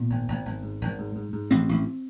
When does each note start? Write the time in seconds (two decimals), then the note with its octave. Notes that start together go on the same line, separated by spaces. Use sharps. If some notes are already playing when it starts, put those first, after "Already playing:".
Already playing: A#2 B3
0.10 G#1
0.28 G#1
0.45 G#1
0.63 G#2
0.81 G#1
0.99 G#2
1.16 G#2
1.33 G#2
1.51 A1 C4
1.69 A1